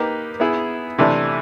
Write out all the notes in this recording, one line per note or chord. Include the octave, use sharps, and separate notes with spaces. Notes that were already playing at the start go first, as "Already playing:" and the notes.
Already playing: A#3 D#4 G4 B4
B3 E4 G#4
C3 E3 A3 D4